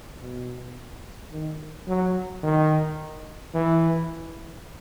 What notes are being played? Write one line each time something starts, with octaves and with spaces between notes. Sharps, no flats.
B2
D#3
F#3
D#3
E3